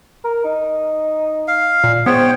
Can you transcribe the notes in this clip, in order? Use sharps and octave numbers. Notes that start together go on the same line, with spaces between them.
A#4
D#4
F5
A#2
G#2 B3 C5 C#5 G5